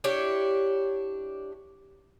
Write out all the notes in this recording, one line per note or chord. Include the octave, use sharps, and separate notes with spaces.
D4 E4 G4 C#5